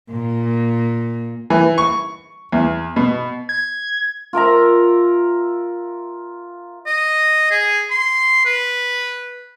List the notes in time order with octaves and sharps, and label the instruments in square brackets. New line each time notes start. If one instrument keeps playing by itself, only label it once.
[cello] A#2
[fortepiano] E3
C#6
E2
B2
[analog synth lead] G#6
[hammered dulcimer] F4 A#4 E5 A#5
[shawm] D#5
G#4
C6
B4